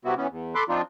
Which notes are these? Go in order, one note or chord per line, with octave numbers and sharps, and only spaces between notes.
C3 F#3 G3 B3 E4 F#4
B2 E3 B3 C#4
E2
A4 B5 C6 D6 F#6
F3 C4 D4 D#4 F4